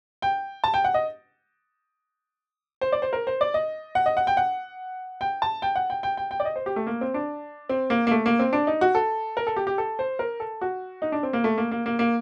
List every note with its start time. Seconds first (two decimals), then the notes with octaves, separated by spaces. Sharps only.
0.22 G5
0.64 A5
0.74 G5
0.84 F#5
0.94 D#5
2.81 C5
2.92 D5
3.02 C5
3.13 A#4
3.27 C5
3.41 D5
3.54 D#5
3.95 F#5
4.06 D#5
4.17 F#5
4.27 G5
4.37 F#5
5.21 G5
5.42 A5
5.62 G5
5.76 F#5
5.90 G5
6.03 G5
6.17 G5
6.31 G5
6.40 D5
6.45 D#5
6.56 C5
6.66 G4
6.76 A3
6.87 A#3
7.01 C4
7.14 D4
7.69 C4
7.90 A#3
8.07 A#3
8.11 A3
8.26 A#3
8.39 C4
8.53 D4
8.67 D#4
8.81 F#4
8.95 A4
9.37 A#4
9.47 A4
9.56 G4
9.67 G4
9.78 A4
9.99 C5
10.19 A#4
10.40 A4
10.61 F#4
11.02 D#4
11.12 D4
11.23 C4
11.33 A#3
11.44 A3
11.58 A#3
11.71 A#3
11.86 A#3
11.99 A#3